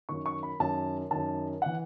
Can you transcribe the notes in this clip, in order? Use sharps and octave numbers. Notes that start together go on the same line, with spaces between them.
F#2 D#3 C#6
C#6
B5
F#2 D#3 A5
F#2 D#3 A5
E3 F#5